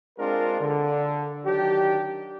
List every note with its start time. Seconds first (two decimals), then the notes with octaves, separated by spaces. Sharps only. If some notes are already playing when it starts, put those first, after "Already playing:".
0.19 G#3 C4 D4 F4 G#4 A#4
0.61 D3
1.45 D#3 F#3 D4 G4